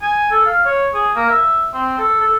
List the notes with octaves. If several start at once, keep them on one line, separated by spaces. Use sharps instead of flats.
G#5
A4
F5
C#5
G#4
A#3
E5
C4
A4
A4